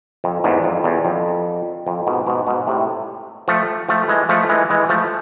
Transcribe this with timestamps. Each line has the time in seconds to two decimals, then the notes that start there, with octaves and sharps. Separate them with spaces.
0.24 F2
0.44 E2 G#2
0.64 F2
0.84 E2
1.05 F2
1.87 F2
2.07 G#2 B2
2.27 G#2 B2
2.47 G#2 B2
2.67 A2 C3
3.48 F3 A3
3.89 F3 A3
4.08 E3 G#3
4.29 F3 A3
4.49 E3 G#3
4.70 E3 G#3
4.89 F3 A3